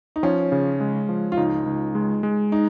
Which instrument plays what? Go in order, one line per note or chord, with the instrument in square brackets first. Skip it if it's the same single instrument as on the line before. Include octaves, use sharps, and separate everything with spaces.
[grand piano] D#4
[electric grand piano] F3 [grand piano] C#4
[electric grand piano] C#3
G#3
F3
[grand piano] F4
[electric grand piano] C#2 [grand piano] D#4
[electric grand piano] C#2
G#3
G#3
[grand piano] D#4